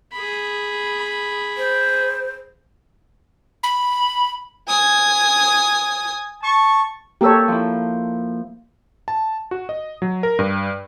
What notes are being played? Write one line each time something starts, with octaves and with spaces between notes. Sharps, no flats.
G#4 B5
C5
B5
G#5 D#6
A5 C#6
A#3 G4 A4 C#5 E6
F3 E4
A5
F#4
D#5
F#3
A#4
G2